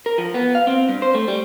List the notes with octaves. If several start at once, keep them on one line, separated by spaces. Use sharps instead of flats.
A#4
F3
B3
F5
C4
G2
C5
A3
G3